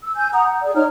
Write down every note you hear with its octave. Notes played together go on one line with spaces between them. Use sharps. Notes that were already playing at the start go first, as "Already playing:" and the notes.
E6
G#5 G6
F#5 A#5 D#6
F#5
G#4 D5
D#4 C#5 A#5 F6